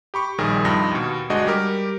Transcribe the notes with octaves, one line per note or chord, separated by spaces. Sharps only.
G4 B5 C#6
A#1 D#3 G3 G#4 A#4
G2 C3 F3 D#4 A#6
D#2 B2
G1 G#3 D4 F#4 D#5
G3 G4 A#4